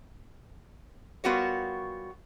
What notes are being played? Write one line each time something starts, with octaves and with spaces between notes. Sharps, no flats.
G3 B3 F4 F#4 A#4 C#5